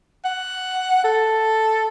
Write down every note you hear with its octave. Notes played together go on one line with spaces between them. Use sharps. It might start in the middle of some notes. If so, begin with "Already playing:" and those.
F#5
A4